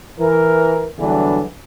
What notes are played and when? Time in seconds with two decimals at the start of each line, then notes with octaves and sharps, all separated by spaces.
0.19 E3 A#4
0.98 E2 D3 E3 F#3 G3 D4